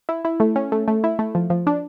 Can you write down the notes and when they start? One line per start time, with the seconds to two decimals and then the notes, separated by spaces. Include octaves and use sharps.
0.09 E4
0.25 E4
0.40 A3
0.56 C#4
0.72 A3
0.88 A3
1.04 E4
1.19 A3
1.35 F3
1.50 F3
1.67 D4